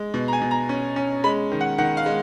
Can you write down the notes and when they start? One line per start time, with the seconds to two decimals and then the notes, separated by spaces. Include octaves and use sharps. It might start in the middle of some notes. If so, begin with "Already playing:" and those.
Already playing: G#3
0.14 B2
0.28 A#5
0.33 G#5
0.42 B2
0.51 A#5
0.69 C#4
0.96 C#4
1.24 G#3 B5
1.51 D#3
1.61 F#5
1.78 D#3 F#5
1.97 F5
2.06 G#3